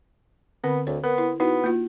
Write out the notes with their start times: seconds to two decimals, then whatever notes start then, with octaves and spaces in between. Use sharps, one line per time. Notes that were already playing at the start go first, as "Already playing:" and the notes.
0.64 D3 B3 C4
0.87 D2 C#5
1.04 B3 A#4
1.18 E4
1.40 B3 D#4 E4 F#4
1.64 A#3 F4